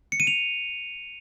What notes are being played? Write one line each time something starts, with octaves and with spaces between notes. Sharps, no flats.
C#7
D#7
F7